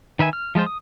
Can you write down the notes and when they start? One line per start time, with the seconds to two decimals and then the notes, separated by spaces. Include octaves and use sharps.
0.19 D#3 B4 E5 G#5
0.33 F6
0.55 F3 G#3 F4 C5
0.66 D#6